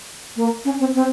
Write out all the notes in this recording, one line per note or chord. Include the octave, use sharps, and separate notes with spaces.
A#3
C#4
C4
C4